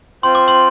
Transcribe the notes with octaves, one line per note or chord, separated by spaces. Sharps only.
C4 F4 C5 G5 C6
D6
C6